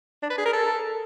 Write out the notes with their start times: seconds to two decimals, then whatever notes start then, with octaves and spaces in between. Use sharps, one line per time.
0.23 D4
0.30 B4
0.38 G#4
0.46 A#4
0.53 A4